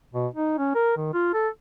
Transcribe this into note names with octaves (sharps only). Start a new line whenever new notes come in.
B2
D#4
C#4
A#4
D#3
F4
A4